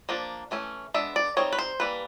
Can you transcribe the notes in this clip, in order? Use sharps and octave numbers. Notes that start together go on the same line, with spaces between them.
F3 A#3 D4
E3 A3 C#4
G#3 B3 D4 E5
D5
G3 C4 D#4 C#5
B4
C5
E3 G3 A#3 B4